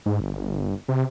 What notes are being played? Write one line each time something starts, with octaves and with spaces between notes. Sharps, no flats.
G#2
G1
C3